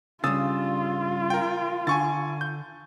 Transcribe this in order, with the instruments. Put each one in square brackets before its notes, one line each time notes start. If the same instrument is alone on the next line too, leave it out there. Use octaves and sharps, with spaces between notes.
[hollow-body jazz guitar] G2 C#3 [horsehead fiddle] F4 [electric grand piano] D#6 E6 A6
[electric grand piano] A#4 G5
[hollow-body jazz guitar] D3 [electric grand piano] G#5 C#6 A6
[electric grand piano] G6